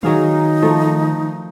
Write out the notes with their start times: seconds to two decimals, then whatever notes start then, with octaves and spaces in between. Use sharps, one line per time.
0.03 D#3 F#3 D#4 G#4 F5
0.62 F3 A3